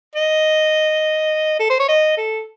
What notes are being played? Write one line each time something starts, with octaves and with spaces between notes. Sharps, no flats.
D#5
A4
C5
C#5
D#5
A4